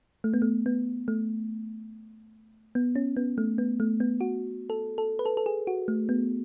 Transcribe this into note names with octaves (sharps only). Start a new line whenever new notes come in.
A3
B3
A3
B3
A3
B3
C#4
B3
A3
B3
A3
B3
F#4
A4
A4
B4
A4
A4
G#4
F#4
A3
B3